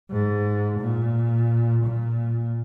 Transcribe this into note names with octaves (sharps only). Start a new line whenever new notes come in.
G#2
A#2
A#2